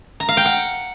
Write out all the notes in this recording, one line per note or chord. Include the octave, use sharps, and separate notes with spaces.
A#5
F5
G5
F#5